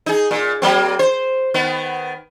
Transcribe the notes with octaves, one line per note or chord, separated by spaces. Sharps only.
D#4 G#4
A#2
F#3 A#3 C4
C5
D#3 B3